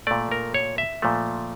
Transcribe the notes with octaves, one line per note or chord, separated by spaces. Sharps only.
A#2 A3 D5
A#4
C#5
E5
A#2 F3 A3